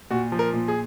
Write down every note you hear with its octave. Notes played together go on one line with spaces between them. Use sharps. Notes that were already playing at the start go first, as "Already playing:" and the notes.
A#2 F#4
F3
A#4
A#2
G#4